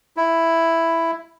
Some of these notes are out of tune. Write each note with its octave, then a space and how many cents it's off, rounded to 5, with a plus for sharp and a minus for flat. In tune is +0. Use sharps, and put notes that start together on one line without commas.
E4 +5